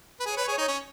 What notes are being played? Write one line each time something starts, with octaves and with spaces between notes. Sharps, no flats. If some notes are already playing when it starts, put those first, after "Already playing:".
B4
G#4 C#5
B4
G#4
D#4
C#4